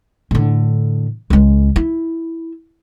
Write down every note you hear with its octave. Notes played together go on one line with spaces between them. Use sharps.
A2 D3
C#2 G#3
E4